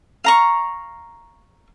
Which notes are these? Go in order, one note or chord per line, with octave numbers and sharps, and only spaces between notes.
F5 A#5 C#6